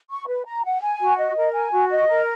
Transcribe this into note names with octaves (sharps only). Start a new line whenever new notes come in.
C#6
B4
A#5
F#5
G#5
F#4
D#5
A#4
G#5
F#4
D#5
A#4